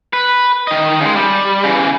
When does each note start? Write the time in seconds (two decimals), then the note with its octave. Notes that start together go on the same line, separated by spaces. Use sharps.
0.13 B4
0.67 D#3 D#5
1.01 C#3 G#3
1.16 G3
1.64 C#3 E3